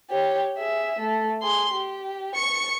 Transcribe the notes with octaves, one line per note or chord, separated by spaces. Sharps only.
G4 C#5
G#4 E5
A3
G#4 C6
G4
C#6 C#7